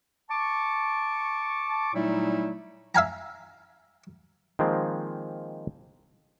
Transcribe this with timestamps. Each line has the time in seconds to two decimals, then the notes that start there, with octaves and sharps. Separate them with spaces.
0.31 A5 C#6 D6
1.94 A#2 F#3 G3 A3 D#4 E4
2.95 E5 F5 G#5 A#5
4.59 D#3 F3 G#3 A#3 C4